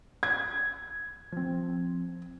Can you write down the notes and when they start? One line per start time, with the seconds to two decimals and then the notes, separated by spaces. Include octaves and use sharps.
0.23 G#6
1.32 F3 C4